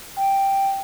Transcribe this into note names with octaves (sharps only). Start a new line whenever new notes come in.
G5